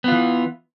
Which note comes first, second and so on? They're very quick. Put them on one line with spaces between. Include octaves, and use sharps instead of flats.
B3 F4 E3